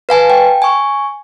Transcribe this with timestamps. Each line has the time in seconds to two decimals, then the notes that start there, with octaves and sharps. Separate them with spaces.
0.09 B4 F5 G#5 A5
0.30 G5
0.62 G#5 C#6